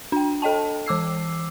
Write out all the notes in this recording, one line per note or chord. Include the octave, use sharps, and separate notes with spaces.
D4 G5
A4 D#5 G5 A5
E3 D6 E6 C7